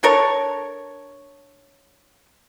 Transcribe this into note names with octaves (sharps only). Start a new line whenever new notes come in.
D4 A4 A#4 C#5